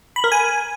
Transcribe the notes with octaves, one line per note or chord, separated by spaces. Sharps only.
B5
A#4
G#5